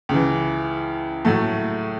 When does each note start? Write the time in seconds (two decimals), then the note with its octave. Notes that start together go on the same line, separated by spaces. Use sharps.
0.09 C#2 C#3 E3
1.25 A2 F#3 A3